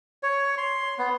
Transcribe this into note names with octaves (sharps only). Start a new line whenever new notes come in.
C#5
C6
B3